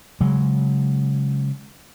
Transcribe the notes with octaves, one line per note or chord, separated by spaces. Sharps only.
C#3 F#3 G#3